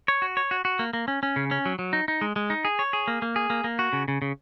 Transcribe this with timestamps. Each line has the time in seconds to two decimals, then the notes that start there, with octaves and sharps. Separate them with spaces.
0.08 C#5
0.22 F#4
0.37 C#5
0.51 F#4
0.65 F#4
0.79 A#3
0.93 A#3
1.08 C#4
1.23 C#4
1.36 C#3
1.51 C#4
1.66 F#3
1.79 F#3
1.93 D#4
2.08 D#4
2.21 G#3
2.36 G#3
2.50 D#4
2.65 G#4
2.79 C#5
2.93 G#4
3.08 A#3
3.22 A#3
3.36 G#4
3.50 A#3
3.64 A#3
3.79 F#4
3.93 C#3
4.08 C#3
4.22 C#3